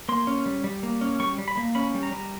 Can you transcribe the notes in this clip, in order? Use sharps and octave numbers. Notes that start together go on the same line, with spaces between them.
A#3 C6
C#4
G3
G3
A#3
C#4
G3 C#6
G3
B5
A#3
C#4 B5
G3
A#5
G3